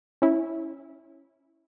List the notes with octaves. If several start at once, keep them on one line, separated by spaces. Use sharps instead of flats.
C#4 E4